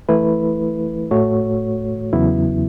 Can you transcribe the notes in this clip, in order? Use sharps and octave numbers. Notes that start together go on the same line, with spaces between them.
E3 A3 E4 B4
A2 A3 F#4 C#5
E2 C#3 F#3 B3 E4